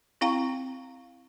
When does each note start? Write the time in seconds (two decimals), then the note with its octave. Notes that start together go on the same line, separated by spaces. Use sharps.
0.21 C4 E4 F5 G5 A#5 C#6